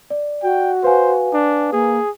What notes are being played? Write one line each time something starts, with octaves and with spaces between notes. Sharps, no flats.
D5
F#4 G5
B4 C5 F5 G#5
D4
A#3 G#4